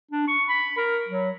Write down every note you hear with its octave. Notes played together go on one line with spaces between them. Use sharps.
D4
C#6
B5
A#4
F#3